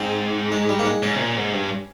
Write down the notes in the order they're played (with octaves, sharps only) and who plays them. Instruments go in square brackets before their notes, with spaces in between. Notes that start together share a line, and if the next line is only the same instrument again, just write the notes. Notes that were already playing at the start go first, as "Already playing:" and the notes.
Already playing: [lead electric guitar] G#2 [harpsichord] C4
[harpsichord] G#3
G3
A#3
G#3
[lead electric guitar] G#2 [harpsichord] C#4
[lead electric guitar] C3
A#2
G#2
G2